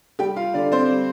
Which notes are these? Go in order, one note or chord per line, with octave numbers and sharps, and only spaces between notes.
G3 G4 G5
F4 F5
D3 D4 D5
C4 C5
G3